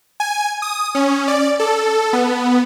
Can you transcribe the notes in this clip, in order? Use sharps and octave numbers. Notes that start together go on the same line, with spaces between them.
G#5
D#6
C#4
D5
A4
B3